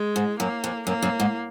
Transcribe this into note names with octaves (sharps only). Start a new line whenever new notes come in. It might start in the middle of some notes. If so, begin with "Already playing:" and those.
Already playing: G#3
G#2
F#2 A#3
F2
F#2 A#3
F#2
G#2